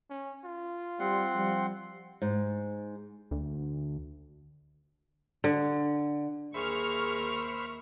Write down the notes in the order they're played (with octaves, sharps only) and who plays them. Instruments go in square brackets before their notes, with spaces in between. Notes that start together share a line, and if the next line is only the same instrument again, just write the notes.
[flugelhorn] C#4
F4
[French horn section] G3 [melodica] C4 F#5 C6
[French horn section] F3 G3
[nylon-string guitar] G#2
[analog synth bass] D2
[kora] D3
[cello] D#2 A#4 [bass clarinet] G#4 [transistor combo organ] C5 E5 B5 [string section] C#6 F6